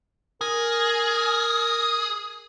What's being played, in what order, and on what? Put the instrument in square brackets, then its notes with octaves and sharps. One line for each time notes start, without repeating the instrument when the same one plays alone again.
[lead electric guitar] G#4 [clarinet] A#4